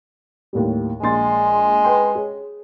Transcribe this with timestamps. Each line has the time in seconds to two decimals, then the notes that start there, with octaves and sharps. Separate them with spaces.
0.53 D#2 A2 G3
1.03 A#1 G#3 C6 A6
1.84 B4 G5 C6
2.15 G#4 C#5